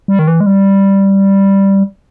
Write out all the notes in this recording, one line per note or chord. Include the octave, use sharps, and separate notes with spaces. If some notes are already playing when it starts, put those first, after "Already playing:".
G3
D#3
E3
G#3
G3